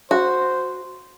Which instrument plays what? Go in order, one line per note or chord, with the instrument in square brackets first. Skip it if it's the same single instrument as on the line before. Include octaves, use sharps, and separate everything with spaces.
[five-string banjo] F#4 [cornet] C5